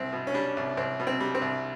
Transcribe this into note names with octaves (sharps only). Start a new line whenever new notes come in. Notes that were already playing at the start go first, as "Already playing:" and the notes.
Already playing: C2 C4
B2
C#4
G3 D4
C2
C2 C4
B2
C4
G3
C4
C2